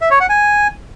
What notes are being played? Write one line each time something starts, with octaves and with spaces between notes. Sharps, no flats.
E5
C#5
F#5
G#5